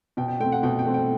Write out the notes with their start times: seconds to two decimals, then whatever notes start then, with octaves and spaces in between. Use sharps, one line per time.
0.17 B2 G5
0.28 G5
0.40 A3 C4 G5
0.52 F#5
0.63 B2 G5
0.79 G5
0.86 A3 C4
0.94 G5